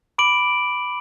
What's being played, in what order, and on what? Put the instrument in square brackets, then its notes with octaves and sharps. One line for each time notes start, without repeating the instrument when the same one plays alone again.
[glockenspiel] B5 D6 D7 F#7